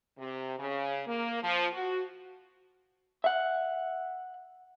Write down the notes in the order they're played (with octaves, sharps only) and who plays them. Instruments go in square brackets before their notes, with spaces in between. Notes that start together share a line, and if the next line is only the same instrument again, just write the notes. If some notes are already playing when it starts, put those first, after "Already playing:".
[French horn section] C3
C#3
A#3
F3
F#4
[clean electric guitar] E5 F#5